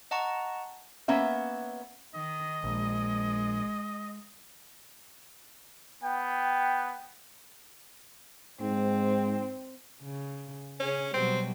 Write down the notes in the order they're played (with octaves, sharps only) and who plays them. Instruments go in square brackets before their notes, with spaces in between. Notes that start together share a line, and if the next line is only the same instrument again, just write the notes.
[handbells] D#5 F#5 A5 A#5 C#6
[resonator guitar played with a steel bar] A#3 B3 C#4 E5
[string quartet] D#3 [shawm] D#5
[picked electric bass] A#1 [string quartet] G#3
[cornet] B3 [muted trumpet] G5
[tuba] G#2 [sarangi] C4
[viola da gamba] C#3
[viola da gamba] C#3 G#4 [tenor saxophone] C#4
[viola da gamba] B2 F#3 G3 [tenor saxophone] C4